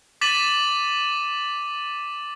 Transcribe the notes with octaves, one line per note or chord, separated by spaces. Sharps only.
D6 A6 B6 D#7 E7 F#7